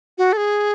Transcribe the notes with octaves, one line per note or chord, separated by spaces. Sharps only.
F#4
A4
G#4